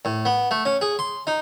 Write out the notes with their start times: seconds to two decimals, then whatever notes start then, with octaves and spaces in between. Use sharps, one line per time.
0.05 A2
0.25 B3
0.51 A3
0.65 C#4
0.81 G#4
0.99 C6
1.27 D#4